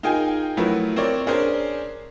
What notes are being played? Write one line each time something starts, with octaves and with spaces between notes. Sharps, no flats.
D#4 F4 G#4 A#4 G5 G#5
F3 F#3 A3 E4 A#4 B4
C4 A#4 C#5 D5
C#4 D4 G#4 A#4 C5